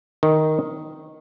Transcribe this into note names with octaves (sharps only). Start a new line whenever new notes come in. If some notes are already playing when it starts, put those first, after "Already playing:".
D#3